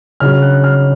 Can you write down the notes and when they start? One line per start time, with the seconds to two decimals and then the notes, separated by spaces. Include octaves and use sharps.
0.20 C#3 F#3 F6
0.42 F#6
0.64 F6